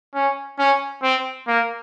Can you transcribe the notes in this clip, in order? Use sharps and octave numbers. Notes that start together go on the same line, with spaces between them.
C#4
C#4
C4
A#3